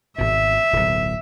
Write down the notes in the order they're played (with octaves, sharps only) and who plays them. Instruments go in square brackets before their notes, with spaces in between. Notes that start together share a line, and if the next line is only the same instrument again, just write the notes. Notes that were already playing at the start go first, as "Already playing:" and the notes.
[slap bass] G#1 B2 [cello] E5
[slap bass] D1 B1